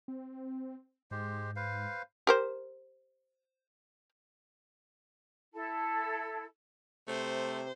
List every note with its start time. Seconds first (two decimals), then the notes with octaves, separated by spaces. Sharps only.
0.08 C4
1.11 G#2 G#3 G4 C5
1.56 B4 C5 F5
2.27 G4 A#4 C5
5.54 E4 A4 A5
7.08 C3 A3 C5